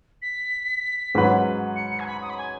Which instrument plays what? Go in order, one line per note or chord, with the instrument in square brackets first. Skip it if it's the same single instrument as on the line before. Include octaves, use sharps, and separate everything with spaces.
[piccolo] B6
[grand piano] G#2 F#3 C#4 F#4 B4
[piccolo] C#7
C#7
G#5
B5
D#6
B5
G#5